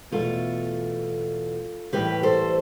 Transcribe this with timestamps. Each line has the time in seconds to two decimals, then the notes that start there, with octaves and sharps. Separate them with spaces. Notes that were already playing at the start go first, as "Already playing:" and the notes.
0.11 E2 B2 A3 F4 A4
1.93 A2 E3 G3 G4 B4
2.23 A4 C5